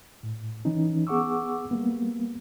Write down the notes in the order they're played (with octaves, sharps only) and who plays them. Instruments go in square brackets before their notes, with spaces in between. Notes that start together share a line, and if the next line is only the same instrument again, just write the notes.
[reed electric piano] A2
E3 C#4 D#4
B3 G#4 F#5 C#6 D6 E6
G3 A#3 B3